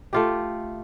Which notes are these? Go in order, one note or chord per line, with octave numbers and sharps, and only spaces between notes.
A3 F4 G4